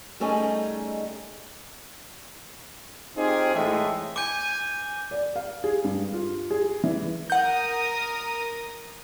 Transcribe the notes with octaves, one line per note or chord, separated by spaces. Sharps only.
G3 A3 C#4 D#4 G#4 D#5
C4 D#4 F4 G4 G#4
A2 E3 G#3 A3 E5
G#5 D6 G6
D5
F5
G#4
G2
F4
G#4
E3
A#4 F#5 D#6 G6